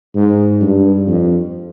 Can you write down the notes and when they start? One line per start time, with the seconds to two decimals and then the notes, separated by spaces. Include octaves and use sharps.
0.15 G#2
0.61 G2
1.07 F2